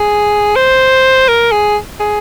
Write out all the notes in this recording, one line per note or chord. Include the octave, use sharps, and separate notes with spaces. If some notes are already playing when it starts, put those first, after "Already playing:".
Already playing: G#4
C5
A#4
G#4
G#4